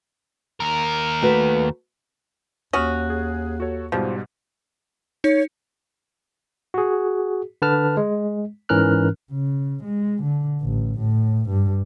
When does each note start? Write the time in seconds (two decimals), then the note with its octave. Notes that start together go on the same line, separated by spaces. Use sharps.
0.60 D#2 A#4
1.22 A3 F#4 B4
2.73 D#2 C#4 F#4 D#6 F6
3.10 G#4
3.60 F#4 A4 C#5
3.92 G#2 B2 F3 G3
5.24 D#4 C#5
6.74 F#4 G#4
7.62 D3 B4 A5 F6
7.97 G#3
8.69 G#2 E3 C#4 A#4 F6 F#6
9.32 C#3
9.84 G#3
10.23 D3
10.62 A1
10.99 A2
11.49 G2